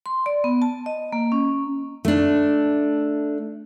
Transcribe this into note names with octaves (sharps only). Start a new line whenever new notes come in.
C6
D5
B3
A5
D#5
A#3
C#4
A3 D4